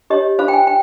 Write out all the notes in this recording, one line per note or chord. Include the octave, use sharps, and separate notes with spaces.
G4 C#5 D#5
F4 C5 F5
G5
G#5
G5